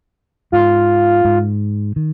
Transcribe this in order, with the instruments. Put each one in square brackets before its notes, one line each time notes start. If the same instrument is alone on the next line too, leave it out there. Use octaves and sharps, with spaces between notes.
[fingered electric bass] G#2 [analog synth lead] F4
[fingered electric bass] G#2
D#3